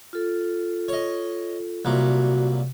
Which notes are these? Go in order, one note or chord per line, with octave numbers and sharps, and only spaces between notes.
F4 A4
C#5 D#5
C2 A#2 F#3 F#4